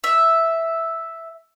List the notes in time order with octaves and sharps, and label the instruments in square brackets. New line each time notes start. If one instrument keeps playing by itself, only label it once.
[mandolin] E5